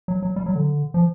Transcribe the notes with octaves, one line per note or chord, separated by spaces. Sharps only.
F#3
F#3
G3
F#3
D3
F3